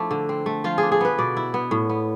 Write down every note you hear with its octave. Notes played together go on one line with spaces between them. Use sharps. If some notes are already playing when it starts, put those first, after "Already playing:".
Already playing: F3 A3 D4 E4
D3
C4
A3
F3 F4
D4 G#4
G#4
B3 B4
B2 D5
E4
B3
A2
B3